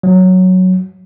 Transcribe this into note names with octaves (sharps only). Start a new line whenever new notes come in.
F#3